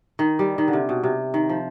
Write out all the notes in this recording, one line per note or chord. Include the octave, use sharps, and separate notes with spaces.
D#3
G3
D#3
D3
C3
B2
C3
D#3
F3